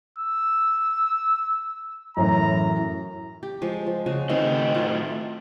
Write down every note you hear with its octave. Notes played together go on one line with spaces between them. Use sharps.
E6
F#2 A2 E3 A#5
G4
F3 G#3
F3
C#3 F#4 G#4
A2 D#3 C4 G#4 D#5
F4 A5